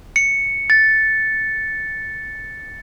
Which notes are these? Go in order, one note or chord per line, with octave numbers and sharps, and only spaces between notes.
C#7
A6